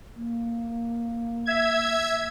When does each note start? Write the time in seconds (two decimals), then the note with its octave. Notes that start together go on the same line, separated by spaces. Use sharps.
0.16 A#3
1.46 E5 G#6